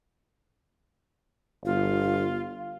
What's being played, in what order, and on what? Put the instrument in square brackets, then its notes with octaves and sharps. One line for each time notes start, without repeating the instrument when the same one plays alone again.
[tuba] G1 [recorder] F4 [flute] F5